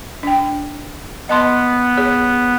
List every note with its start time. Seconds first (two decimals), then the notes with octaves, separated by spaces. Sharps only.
0.23 D4 G5
1.29 B3 D#5 A5 C6
1.97 G#4 C#5